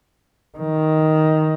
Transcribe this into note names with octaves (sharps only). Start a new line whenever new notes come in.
D#3